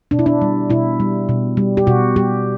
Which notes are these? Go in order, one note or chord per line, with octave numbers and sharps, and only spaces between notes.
B2 D4
E4
D4
G3
B2 E4
G3
B2
G3
G4
B2 F#4
G3 G4